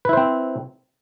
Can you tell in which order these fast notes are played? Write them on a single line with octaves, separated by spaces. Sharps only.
B4 E4 C5 C4